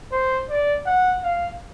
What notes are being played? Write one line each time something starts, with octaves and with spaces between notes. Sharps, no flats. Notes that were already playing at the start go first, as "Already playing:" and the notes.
C5
D5
F#5
F5